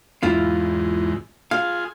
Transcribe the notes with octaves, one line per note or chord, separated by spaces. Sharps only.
E2 G#2 E4 F4 F5
F4 G#4 F5